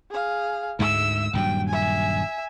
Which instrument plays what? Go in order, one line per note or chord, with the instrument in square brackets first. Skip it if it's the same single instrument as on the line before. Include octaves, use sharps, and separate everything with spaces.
[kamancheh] G#4 F5
[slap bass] D2 G#2 G#3 [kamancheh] E5 E6
[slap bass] D#1 G2 F#3 [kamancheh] G5
[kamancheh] E5 G#5